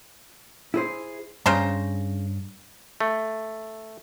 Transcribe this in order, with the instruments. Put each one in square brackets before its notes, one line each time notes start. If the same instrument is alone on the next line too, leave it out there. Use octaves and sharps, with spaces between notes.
[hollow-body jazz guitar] E4 G#4 C5
[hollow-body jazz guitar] G2 [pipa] C#3 C5 A#5
[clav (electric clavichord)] A3